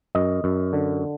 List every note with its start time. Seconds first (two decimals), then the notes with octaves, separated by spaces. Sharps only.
0.15 F#2 D#5
0.44 F#2
0.73 D3